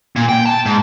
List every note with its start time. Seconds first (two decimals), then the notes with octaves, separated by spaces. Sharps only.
0.16 A#2
0.29 G5
0.46 A5
0.66 G#2